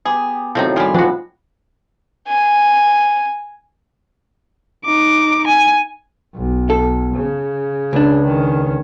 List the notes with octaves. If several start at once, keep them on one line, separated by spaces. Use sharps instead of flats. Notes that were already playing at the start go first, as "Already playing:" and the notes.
B3 G4 G#4
A2 C3 D#3 F3 F#3 C4 D#4
F3 G3 F4 G#4 G5 B5
A2 F3 D4 F#4
G#5
D#4 D6
G#5
B1
A4
C#3
C#2 D4
D#3 C#4